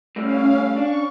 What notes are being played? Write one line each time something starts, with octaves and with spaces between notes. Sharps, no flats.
A2 G3 A3 C#4 F5
D4 C#6